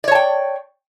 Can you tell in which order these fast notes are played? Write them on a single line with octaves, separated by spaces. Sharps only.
D5 C#5 A5 G5